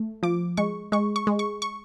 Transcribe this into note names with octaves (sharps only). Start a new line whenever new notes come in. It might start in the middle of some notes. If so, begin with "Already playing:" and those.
Already playing: A3
F3 D6
G#3 C#6
G#3 C#6
C#6
G#3
C#6
C#6